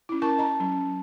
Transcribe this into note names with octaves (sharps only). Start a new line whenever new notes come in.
C#4 E4
E4 A#4 A5 C#6
D#5 A#5
F#3 C#4